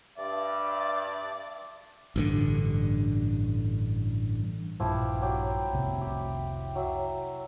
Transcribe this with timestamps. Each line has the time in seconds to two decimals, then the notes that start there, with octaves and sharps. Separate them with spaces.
0.18 G2 D5 E5
2.16 A1 G2 D3
4.80 A#1 G2 F3 E4 G4
5.21 F#3 G4
5.73 F1 C2
6.01 G4
6.75 F#3 E5